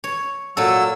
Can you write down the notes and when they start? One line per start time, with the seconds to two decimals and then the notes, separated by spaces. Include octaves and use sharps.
0.04 C#5
0.57 A#2 F#3 A4 E6